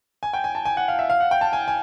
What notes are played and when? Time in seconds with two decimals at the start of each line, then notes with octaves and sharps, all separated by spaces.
0.23 G#5
0.33 G5
0.44 G#5
0.55 A5
0.65 G#5
0.77 F#5
0.88 F5
0.99 E5
1.10 F5
1.20 F#5
1.31 G5
1.41 A5
1.53 G#5
1.68 G#5